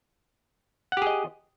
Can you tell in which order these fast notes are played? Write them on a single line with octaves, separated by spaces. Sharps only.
F#5 G4 G#4 D#5